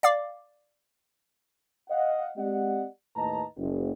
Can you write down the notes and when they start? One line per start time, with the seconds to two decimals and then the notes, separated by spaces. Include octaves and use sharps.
0.03 D5 F5 D6
1.90 D#5 F5 F#5
2.37 G#3 C4 G4 D5 D#5 F#5
3.16 D#2 A2 B4 D#5 A5 A#5
3.58 F#1